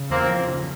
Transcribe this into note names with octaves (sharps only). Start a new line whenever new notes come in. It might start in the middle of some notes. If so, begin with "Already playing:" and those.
Already playing: C#3
E2 A#3 C4
F3
C#3